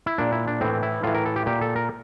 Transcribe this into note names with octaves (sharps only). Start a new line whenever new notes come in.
E4
A#2 D4
E4
D4
A2 E3 C4
E4
A2 E3 F4
A#4
A4
G4
A#2 G4
A4
A#4